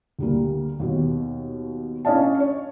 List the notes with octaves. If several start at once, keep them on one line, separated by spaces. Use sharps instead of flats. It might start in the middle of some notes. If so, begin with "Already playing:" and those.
D2 G3 A#3
D#2 B2
C#4 D4 D#5 F5 A5
C#5